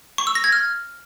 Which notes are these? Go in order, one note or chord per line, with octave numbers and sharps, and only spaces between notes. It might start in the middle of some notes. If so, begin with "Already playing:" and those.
C#6
E6
A#6
G#6
F6